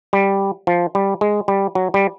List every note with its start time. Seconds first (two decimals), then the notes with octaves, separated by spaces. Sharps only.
0.13 G3
0.67 F3
0.95 G3
1.21 G#3
1.48 G3
1.75 F#3
1.94 G3